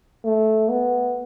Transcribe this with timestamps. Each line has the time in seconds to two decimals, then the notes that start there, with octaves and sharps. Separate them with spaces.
0.25 A3
0.70 B3